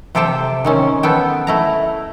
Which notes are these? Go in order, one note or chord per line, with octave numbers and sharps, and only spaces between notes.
C3 G4 A4 C5 G5 A5
D#3 C4 C#4
B3 A4 G5
A3 E4 A#5